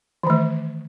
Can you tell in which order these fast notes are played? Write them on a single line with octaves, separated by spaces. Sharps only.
E3 D#3 A3